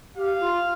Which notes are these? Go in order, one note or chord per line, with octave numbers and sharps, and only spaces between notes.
G4 F5
F4